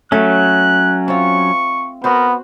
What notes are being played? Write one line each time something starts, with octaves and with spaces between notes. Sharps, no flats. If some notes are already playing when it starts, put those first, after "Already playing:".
F#3 A3 C#4 F#6
C4 F4 C#6
B3 F#4 A#4 C5